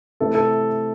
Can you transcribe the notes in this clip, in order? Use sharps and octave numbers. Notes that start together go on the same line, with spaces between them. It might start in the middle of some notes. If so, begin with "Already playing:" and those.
C3 E3 A3 A4
A4